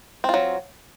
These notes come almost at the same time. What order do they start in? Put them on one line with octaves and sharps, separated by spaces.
C4 F4 F#3